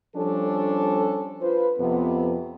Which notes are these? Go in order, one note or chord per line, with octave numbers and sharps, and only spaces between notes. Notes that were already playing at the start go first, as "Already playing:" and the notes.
F3 G3 C#4 D4 A4
F4 B4 C5
F2 C3 B3